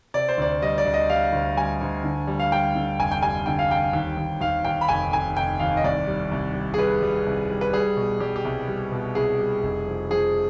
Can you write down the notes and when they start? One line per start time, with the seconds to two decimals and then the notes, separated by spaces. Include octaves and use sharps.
0.14 C3 D5
0.29 C5
0.38 D2 D5
0.62 G3 D#5
0.78 D5
0.85 D2
0.94 D#5
1.09 G3 F5
1.33 D2
1.57 G3 G#5
1.81 D2
2.04 D3
2.27 G3
2.40 F5
2.52 G3 G5
2.75 D3
2.99 F1 G#5
3.11 G5
3.22 G3 G#5
3.46 D3 G5
3.59 F5
3.70 G3 G5
3.93 D#2
4.17 D#2
4.41 D#2 F5
4.65 D#2 G5
4.81 B5
4.89 F1 G#5
5.13 F1 G#5
5.36 F1 G5
5.59 D#2 F5
5.77 D#5
5.84 C2 D5
6.07 G3
6.31 C2
6.54 G3
6.74 G#4
6.78 G3 B4
7.02 G3
7.26 C2
7.50 G3
7.61 B4
7.73 G3 G#4
7.97 B2
8.20 G3 G4
8.36 G4
8.45 C2
8.68 G3
8.92 B2
9.15 C2 G#4
9.39 G3
9.63 F1
9.87 F3
10.11 F3 G#4